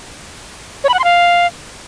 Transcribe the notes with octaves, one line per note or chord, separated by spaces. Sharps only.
C#5
B5
F#5
C6
F5